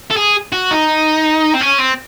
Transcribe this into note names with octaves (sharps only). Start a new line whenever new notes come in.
A4
G#4
F#4
D#4
C4
C#4
C4